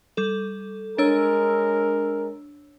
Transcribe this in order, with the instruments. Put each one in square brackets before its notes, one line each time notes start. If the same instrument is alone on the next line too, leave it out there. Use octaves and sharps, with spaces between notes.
[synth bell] G3 A4
[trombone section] G#3 A#4 [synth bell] D4 C#5 E6